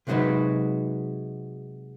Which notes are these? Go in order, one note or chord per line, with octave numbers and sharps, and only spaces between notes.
C3 F#3 G#3 D#4 F#4 B4